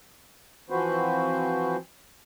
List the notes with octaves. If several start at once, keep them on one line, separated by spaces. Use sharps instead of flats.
E3 F3 C4 F#4 B4 C5